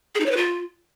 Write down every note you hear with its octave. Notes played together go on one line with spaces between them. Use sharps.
G#4
D#4
C#5
B4
F4